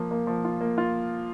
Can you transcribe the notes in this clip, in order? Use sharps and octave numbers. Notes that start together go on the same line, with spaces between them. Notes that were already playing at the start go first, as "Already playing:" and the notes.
Already playing: F3 A#3
A#3
F3
F4
A#3
F4